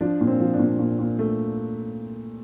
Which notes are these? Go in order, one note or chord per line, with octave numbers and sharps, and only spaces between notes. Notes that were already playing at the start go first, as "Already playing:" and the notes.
F3 D4
A#2
C4
F3
D4
A#2
A#2
A#2
A3